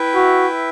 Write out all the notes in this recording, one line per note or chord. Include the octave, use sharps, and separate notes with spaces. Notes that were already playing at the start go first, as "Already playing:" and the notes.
Already playing: E4 B4 E5 G5
F#4